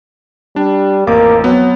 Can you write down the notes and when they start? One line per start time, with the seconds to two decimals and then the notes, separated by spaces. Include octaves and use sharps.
0.56 G3 D4
1.07 A1 F2 A#3 D6
1.44 F#3 B3 C4